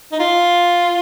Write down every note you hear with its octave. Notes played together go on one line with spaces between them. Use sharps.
D#4
F4